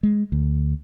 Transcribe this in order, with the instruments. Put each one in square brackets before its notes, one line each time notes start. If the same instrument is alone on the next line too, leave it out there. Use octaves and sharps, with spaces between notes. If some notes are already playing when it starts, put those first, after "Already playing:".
[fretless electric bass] G#3
D2